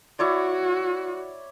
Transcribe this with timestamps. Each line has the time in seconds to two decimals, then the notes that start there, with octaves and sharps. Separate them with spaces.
0.19 E4 F#4 C#5 D5